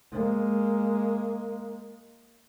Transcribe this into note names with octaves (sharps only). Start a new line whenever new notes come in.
G#3 A#3